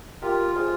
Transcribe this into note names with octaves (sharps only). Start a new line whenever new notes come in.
F4 G4 A#4
F4 G#4 C5